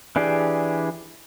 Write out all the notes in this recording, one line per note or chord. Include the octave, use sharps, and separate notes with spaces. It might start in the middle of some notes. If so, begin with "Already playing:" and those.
E3 D4 G4 G#4 D5